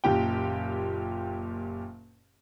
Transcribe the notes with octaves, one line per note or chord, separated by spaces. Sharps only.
F#1 A#2 G4 G5